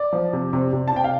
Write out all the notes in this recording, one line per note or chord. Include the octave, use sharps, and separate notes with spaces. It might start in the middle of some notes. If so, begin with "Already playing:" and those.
Already playing: D5
F3
C3
C3
C3
A5
C3 G5
F5